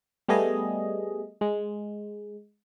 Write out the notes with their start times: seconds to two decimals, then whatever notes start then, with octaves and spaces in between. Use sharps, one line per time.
0.29 G3 A3 B3 G#4 D#5
1.41 G#3